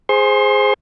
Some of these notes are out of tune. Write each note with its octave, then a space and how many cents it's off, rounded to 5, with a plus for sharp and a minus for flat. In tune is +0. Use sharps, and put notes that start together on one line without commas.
G#4 +0 C5 +0 C6 +35